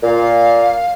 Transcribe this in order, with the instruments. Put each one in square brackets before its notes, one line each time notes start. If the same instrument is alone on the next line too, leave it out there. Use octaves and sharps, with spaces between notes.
[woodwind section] A#2 [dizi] F5